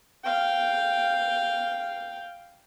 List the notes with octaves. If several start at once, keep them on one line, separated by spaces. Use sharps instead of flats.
F5 G5